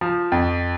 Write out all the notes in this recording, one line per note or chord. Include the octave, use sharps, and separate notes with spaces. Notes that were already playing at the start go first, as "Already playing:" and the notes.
F3
F2